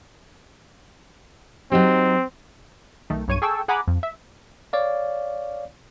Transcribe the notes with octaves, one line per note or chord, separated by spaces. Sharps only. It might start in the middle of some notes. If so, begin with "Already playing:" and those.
F#3 C4 D#4 G4
B1 D#3 A3
B1 G2 C#5 C#6 D#7
G#4 A4 G5 A5 C#6 E6
G#4 F#5 G#5 A#5 B5 D6
F2
E5
C#5 D5 F5